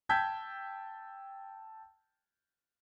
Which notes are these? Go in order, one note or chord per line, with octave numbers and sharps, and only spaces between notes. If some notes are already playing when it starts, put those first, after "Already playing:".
G5 A5 E6 G6 G#6 B6